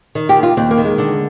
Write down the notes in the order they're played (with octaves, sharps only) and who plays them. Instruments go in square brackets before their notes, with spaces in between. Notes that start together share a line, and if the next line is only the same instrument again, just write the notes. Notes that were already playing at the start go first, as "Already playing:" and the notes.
[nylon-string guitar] D#3 D#4
G4
D#2
F4
D#2 C4
A#3
D#3
G#3
D3